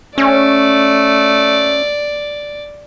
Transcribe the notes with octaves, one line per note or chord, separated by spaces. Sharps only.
A3 C#4 D5